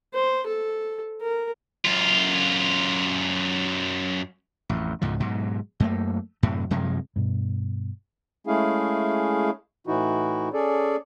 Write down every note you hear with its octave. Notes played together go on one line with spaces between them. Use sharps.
C5
A4
A#4
F#2 F4
A1 F2
C#2 G#2 B2 F3
G#2 B2 F#3
F#2 A3 A#3
F#2 A2 C3
F#2 C3 F3 G#3
G2 B2
G#3 A3 C#4 E4 G#4 F5
A2 E3 D#4 E4 F#4
C#4 G#4 A4 D5